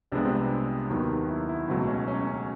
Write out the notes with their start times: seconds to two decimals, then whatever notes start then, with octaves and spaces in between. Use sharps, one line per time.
0.12 C2 C3 F3 G#3 B3 D4
0.25 C4
0.37 C4
0.90 D#2 D#3 F#3 B3
1.29 E4
1.49 E4
1.68 C#2 B2 F#3 A3 C4
1.87 C#4
2.08 C#4
2.27 C#4